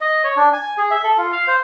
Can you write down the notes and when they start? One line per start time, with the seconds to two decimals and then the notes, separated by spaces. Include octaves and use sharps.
0.01 D#5
0.24 C#5
0.37 D4
0.53 G#5
0.78 G#4
0.91 E5
1.04 A4
1.18 F4
1.32 F5
1.47 C5